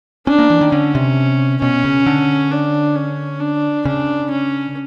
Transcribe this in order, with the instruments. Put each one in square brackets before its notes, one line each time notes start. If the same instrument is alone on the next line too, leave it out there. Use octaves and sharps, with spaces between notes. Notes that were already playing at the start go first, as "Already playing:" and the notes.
[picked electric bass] C#4 [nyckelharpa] D4
[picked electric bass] A#3
E3
D#3
[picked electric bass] D3 [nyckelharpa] C#4
[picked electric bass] C3
[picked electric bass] B2 [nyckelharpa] C#4
[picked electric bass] C#3
D3
[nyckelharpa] D4
C#4
D4
[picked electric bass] C#3 [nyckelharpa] D4
[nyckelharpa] C#4